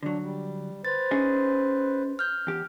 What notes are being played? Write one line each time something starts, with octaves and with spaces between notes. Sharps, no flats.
D3 F#3 D4
G3
B4 C5 A6
C#4 D#4 G#4
F6 G6
E2 G4